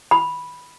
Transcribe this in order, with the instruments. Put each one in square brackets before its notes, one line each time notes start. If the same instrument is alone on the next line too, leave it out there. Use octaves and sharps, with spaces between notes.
[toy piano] B5